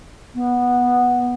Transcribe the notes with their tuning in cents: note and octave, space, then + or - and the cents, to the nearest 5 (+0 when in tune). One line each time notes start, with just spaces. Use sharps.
B3 -10